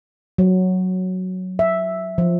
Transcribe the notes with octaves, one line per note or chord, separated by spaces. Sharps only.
F#3
E5
F3